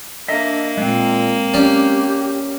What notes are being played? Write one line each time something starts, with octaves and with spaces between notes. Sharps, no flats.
A#3 D4 D#5 E5
A#2 G#3 C4
C#4 G4 D5